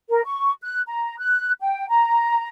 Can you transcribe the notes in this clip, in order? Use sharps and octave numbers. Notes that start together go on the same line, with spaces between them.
A#4
C#6
F#6
A#5
F#6
G5
A#5